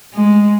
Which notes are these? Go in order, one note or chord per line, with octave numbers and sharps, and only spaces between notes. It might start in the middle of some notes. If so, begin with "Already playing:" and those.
G#3